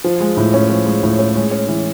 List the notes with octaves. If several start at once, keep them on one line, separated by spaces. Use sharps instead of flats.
F3
G#3
A2
C#4
F3
G#3
A2
C#4
G#3
C#4
E3